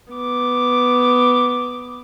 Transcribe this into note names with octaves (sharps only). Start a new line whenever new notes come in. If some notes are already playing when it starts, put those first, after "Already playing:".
B3 D6